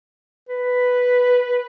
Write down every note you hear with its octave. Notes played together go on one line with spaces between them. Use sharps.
B4